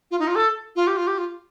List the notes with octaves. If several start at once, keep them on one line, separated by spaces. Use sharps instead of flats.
F4
D#4
F4
A4
F4
G4
F4
G4
F4